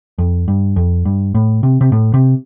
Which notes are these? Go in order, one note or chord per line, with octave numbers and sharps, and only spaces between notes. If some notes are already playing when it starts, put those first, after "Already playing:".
F2
G2
F2
G2
A2
C3
C3
A2
C3